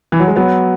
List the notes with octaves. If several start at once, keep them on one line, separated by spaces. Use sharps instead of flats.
E3
F#3
G#3
F#3 B3